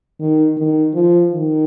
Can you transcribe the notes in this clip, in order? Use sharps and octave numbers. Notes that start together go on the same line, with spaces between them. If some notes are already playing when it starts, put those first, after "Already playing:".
D#3
D#3
F3
D#3